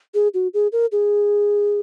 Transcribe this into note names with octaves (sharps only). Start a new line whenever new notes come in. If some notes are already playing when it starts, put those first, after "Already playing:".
G#4
F#4
G#4
A#4
G#4